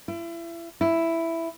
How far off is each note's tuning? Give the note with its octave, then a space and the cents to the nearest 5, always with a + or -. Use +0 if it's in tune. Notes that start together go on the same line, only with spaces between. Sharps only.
E4 +35
E4 +5